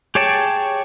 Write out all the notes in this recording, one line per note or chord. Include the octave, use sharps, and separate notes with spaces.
G4 G#4 C#5 G5 A5